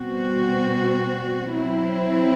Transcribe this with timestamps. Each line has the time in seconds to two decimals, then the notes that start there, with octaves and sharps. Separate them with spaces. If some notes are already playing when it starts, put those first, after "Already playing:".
Already playing: B2 G3 C4 F#4
1.50 F#3 C4 E4